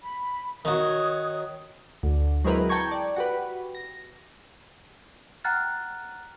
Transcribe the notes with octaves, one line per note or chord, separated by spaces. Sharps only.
B5
D#3 F#4 C#5 D#6
D2
F#3 G#3 C4 E4 A#4 B4
G5 A5 A#5 C#6 G#6
D5
F#4 G4 B4
A#6
F#5 G5 A#5 F6 F#6 A6